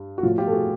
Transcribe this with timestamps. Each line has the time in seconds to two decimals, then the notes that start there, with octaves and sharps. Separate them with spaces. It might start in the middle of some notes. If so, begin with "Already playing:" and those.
Already playing: G2
0.18 F#4
0.23 A2 F3 F4
0.38 F4 G4
0.47 A4
0.53 F#4 G#4